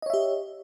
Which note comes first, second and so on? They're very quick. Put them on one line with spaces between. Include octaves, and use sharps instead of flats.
D#5 C#5 E5 G4